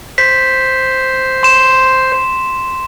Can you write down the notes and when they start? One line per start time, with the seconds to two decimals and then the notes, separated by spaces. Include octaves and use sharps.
0.18 C5 B6
1.43 C6 E7